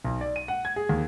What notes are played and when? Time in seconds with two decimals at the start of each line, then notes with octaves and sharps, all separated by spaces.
0.04 B1
0.21 D5
0.36 D#7
0.48 F#5
0.65 G#6
0.76 G#4
0.89 D#2